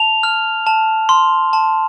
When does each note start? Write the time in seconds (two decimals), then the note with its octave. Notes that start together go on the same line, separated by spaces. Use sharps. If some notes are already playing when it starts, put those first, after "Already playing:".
Already playing: A5 F7
0.23 F6
0.67 A5
1.09 C6
1.53 A5